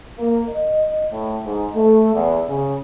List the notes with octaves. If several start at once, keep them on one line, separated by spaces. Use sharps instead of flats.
A#3
D#5
A2
G#2
A3
E2
C#3